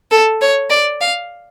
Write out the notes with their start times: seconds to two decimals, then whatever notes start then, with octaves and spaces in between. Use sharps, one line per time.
0.11 A4
0.41 C#5
0.70 D5
1.01 F5